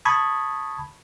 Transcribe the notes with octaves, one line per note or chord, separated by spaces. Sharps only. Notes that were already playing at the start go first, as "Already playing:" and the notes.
A5 B5 C#6 D#6 G#6